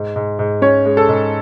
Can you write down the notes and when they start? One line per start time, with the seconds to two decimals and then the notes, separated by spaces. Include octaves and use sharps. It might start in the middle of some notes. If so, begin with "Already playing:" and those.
Already playing: G#2
0.16 G#2
0.39 G#2
0.62 C#4 C#5
0.85 G#3
0.97 A4
1.09 G#2